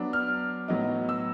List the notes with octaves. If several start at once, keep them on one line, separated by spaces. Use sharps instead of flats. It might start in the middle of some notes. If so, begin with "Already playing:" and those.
Already playing: F#3 B3 D4
F6
A2 F#3 B3 D#4
E6